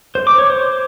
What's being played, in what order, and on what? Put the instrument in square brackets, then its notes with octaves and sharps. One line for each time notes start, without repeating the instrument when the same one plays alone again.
[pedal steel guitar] C5
D6
C#5
C5